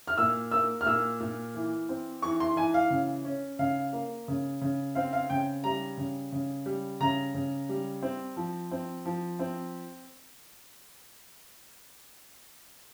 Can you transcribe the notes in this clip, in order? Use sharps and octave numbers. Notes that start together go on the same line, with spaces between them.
F6
A#2 E6
A#3 E6
F6
A#2 E6
A#2
E3
C4
E3 C#6
C6
E3 G#5
F5
C#3
C#4
C#3 F5
A#3
C#3
C#3
C4 F5
F5
C#3 G5
G3 A#5
C#3
C#3
G3
C#3 A#5
C#3
G3
C4
F3
C4
F3
C4